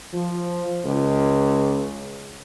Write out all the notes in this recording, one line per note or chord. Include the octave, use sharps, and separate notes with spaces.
F3
C#2